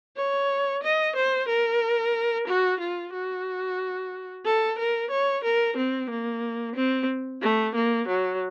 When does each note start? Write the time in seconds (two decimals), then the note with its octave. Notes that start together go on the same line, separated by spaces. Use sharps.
0.17 C#5
0.83 D#5
1.16 C5
1.48 A#4
2.47 F#4
2.80 F4
3.13 F#4
4.46 A4
4.79 A#4
5.11 C#5
5.44 A#4
5.77 C4
6.10 A#3
6.76 C4
7.42 A3
7.75 A#3
8.07 F#3